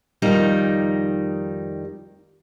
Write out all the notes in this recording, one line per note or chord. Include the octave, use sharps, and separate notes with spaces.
F2 D#3 G3 D#4